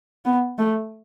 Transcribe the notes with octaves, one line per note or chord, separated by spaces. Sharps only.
B3
A3